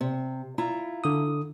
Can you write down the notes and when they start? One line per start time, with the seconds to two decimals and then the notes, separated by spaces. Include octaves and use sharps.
0.01 C3
0.58 E4 F4 A#5
1.04 D3 D#6